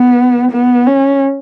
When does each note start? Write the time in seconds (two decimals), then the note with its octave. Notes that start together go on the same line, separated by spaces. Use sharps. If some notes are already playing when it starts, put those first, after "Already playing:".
Already playing: B3
0.51 B3
0.87 C#4